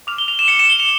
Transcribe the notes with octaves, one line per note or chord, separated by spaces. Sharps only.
D6 F6 F7
G7
F7
E7
C#7
E7
G7
F7